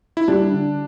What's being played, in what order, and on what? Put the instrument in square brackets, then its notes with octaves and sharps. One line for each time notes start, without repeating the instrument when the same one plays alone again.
[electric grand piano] E4
[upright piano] G3 [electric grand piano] D4
[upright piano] D3